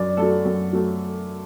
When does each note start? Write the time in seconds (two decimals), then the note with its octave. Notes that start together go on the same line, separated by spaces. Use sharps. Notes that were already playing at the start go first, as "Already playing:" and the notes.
Already playing: F#2 D5
0.17 F#3 A3 A4
0.45 F#2
0.73 F#3 A3